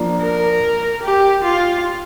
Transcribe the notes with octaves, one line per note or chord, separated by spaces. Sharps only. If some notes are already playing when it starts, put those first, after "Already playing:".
Already playing: F3 A#3 D4
A#4
G4
F4